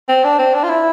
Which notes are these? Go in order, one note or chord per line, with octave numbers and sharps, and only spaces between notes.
C4
D4
C4
D4
F4
E4